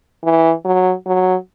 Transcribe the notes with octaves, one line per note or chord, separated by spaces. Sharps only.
E3
F#3
F#3